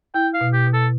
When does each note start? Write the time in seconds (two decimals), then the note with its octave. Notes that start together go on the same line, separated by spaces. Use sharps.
0.14 E4 G5
0.34 F5
0.41 B2
0.53 G4
0.67 B2
0.73 A4